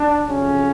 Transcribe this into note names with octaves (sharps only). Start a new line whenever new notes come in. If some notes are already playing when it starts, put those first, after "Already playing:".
Already playing: D4
F2 C#3 F#3 C#4